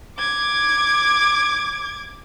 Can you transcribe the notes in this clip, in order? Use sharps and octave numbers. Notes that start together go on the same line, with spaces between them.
D6 G#6